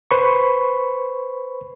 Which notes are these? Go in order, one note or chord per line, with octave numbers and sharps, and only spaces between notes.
B4 C5 B5 C#6